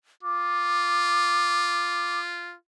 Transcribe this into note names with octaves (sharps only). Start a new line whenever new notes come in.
F4 D6